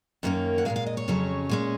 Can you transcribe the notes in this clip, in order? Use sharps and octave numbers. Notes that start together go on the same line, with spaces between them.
F#2 D#3 A#3 C#4
F#5
A#2 F3 G#3 F5
F5
D#5
C#5
F2 C#3 F#3 C#4
A#2 G#3 C#4